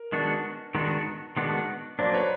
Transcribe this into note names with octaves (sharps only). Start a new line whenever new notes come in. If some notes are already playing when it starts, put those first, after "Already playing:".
Already playing: A#4
D#3 G#3 B3 D4 F#4
D#3 G#3 B3 D4 F#4
D#3 G#3 B3 D4 F#4
F#3 A#3 D4 C5 D5
B4 C#5